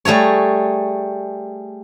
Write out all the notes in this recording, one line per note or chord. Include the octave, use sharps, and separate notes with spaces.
G3 A3 G#4 C#5